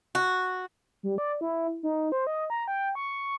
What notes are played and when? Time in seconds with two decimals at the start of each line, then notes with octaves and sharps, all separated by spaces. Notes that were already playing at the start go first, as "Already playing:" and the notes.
0.15 F#4
1.03 G3
1.18 D5
1.41 E4
1.83 D#4
2.12 C5
2.27 D#5
2.50 A#5
2.68 G5
2.95 C#6